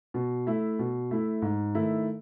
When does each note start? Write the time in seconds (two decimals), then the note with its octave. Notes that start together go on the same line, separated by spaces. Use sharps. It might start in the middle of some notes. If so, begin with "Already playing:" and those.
0.14 B2
0.47 A3 E4
0.79 B2
1.11 A3 E4
1.42 G#2
1.75 D#3 A3 E4